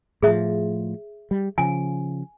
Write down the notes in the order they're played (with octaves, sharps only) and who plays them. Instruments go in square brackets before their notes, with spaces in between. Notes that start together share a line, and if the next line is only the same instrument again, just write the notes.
[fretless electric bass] A2 F3 [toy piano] G#4 E5
[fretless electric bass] G3
[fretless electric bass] C#3 F3 [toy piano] G#5